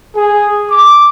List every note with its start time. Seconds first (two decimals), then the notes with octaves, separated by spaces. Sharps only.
0.15 G#4
0.70 D6